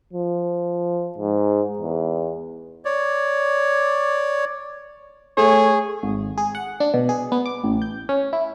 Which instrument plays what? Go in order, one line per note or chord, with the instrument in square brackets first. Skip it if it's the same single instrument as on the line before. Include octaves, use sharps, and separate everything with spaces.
[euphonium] F3
G#2
E2
[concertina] C#5 D5
[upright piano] A3 [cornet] G#4 [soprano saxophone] C#5
[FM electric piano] G#1
G#4
F#5
D4
B2
G#4
B3
D6
A1
G6
C#4
E4